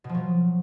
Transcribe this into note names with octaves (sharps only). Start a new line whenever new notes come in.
B2
F3
F#3